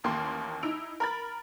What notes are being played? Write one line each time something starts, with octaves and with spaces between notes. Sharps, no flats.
A1 D#2 A#3 G5 C6
D#4 E4 E6 D7 F7
A#4 B5 A6